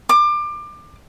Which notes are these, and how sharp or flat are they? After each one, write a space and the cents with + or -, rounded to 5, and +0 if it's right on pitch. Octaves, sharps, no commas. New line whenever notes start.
D6 +25